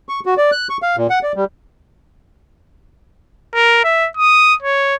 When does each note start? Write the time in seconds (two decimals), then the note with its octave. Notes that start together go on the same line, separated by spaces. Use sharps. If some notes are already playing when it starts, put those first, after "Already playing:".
0.09 C#6
0.26 F#4
0.37 D5
0.52 F#6
0.70 C#6
0.82 F5
0.97 A#2
1.10 F#5
1.23 D5
1.35 G3
3.54 A#4
3.84 E5
4.17 D#6
4.62 C#5